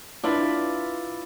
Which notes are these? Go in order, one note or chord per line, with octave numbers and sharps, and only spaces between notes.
D4 E4 F4 B4